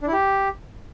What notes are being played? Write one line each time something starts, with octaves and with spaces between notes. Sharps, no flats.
D4
E4
G4